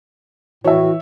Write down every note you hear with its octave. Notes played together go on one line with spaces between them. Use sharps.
A2 E3 F#4 C#5 E5